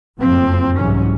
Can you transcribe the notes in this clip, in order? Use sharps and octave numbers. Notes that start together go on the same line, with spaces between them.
F#1 F2 A2 F3 C4
C2 G#2 C3 E3 F#3 C#4